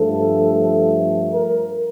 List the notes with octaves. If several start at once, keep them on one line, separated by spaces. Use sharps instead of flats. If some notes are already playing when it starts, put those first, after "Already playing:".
Already playing: G2 F3 A3 A4
A#4